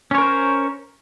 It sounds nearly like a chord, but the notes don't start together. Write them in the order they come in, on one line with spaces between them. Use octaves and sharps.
C#4 C#5 A#4 C5